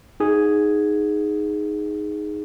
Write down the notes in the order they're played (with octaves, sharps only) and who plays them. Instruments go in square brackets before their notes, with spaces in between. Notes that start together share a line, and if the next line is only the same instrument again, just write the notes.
[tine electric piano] D#4 G#4